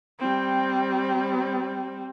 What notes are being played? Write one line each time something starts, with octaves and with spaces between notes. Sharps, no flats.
G3 C4